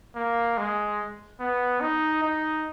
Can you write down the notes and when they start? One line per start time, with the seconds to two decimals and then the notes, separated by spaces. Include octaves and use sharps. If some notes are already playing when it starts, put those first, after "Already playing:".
0.16 A#3
0.57 G#3
1.40 B3
1.81 D#4
2.22 D#4